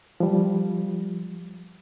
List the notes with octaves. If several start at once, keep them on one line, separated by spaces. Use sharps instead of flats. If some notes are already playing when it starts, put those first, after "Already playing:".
F3 G3